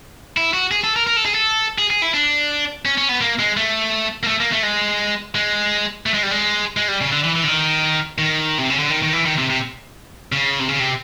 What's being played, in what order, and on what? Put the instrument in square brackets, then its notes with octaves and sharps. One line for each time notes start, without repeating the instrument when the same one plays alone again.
[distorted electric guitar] E4
F#4
G#4
A4
A#4
A#4
A4
G#4
A4
G#4
G#4
E4
D4
C#4
C#4
B3
A#3
G#3
A3
A#3
A3
A#3
A3
G#3
G#3
A3
G#3
G3
G#3
G#3
G3
C#3
D3
E3
E3
D3
D#3
D#3
C3
C#3
D3
D#3
D#3
E3
D#3
C3
C3
C#3
C3
C#3
C3